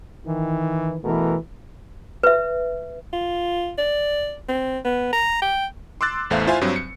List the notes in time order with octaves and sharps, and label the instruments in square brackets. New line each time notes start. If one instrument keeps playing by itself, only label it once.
[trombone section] D#3 E3
B2 E3 A3 A#4
[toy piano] B4 E5
[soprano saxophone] F4
D5
C4
B3
A#5
G5
[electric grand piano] C6 D6 E6 F#6 A6
A1 E2 A3 C5 E5 F5
E4 F4 C5 E5 F5 G#5
G2 F#3 C4
C#7